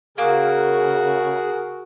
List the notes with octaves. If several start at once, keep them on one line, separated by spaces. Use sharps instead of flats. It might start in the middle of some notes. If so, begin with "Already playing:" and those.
C#3 A#3 F#4 G#4 A#4